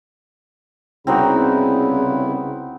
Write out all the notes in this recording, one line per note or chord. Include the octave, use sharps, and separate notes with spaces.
C2 C#3 B3 C4 D#4 E4 F#4